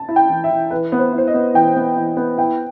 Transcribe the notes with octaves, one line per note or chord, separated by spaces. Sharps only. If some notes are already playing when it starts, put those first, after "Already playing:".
Already playing: A5
E4
G5
E3
E5
E3
E3 B4
B3
C5
E4
C5
D#5
B3
E3 G5
B3
E3
B3
E4 G5